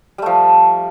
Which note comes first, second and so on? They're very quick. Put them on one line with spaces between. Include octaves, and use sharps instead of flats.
G3 A3 F3